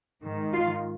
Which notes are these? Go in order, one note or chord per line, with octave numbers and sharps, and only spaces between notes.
G#2 D#3
F4